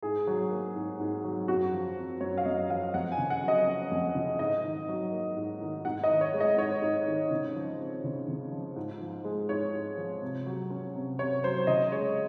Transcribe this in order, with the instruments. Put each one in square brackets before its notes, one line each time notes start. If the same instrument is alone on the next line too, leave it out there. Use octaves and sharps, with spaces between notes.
[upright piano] G#2 G#4
F#3
A#3
G#2
G#2
F#3
F#2 F#4
F3
C4
F#2 C#5
F5
F#2 D#5
F3 F5
F2 F#5
G#5
C#3
F#5
F#3
D#5
C#4
F2
C#3
G#2 D#5
D#3
F#3
A#3
G#2
D#3
G#2 F#5
D#5
D#3
C#5
G#3
D#5
G#2 C#5
G#2
D#3
C#3
F3
C4
C#3
C#3
F3
G#2
F3
G#3
G#2 C#5
G#2
F3
C3
F#3
C#4
C3
C3 C#5
F#3 C5
C#3 D#5
G#3 C#5